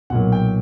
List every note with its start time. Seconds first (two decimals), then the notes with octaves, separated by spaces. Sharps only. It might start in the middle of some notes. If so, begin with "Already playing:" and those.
0.10 B1 A#2 F#3 F#5
0.32 G5